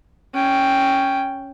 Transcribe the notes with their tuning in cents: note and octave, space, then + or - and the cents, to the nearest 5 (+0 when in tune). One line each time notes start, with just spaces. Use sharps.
C#4 +0 G5 +0